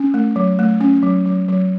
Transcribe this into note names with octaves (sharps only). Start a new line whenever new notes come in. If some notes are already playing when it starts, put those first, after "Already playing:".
Already playing: C#4
A3
F#3
A3
C#4
F#3
F#3
F#3